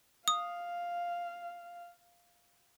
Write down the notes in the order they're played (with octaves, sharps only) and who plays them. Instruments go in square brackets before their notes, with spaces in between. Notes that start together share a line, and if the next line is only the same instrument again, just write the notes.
[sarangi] F5 [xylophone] D#6